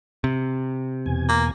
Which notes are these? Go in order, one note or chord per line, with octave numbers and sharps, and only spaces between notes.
C3
E2 B2 G#5
A#3